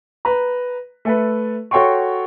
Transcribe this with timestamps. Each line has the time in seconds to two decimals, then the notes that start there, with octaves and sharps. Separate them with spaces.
0.25 B4 A#5
1.05 A3 A4 B4
1.71 F#4 A4 C#5 G5 C6 C#6